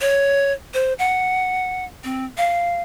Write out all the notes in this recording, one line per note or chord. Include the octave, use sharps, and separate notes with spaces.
C#5
C5
F#5
C4
F5